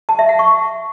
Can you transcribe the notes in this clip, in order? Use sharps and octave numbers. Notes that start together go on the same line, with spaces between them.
A5
E5
F#5
C#6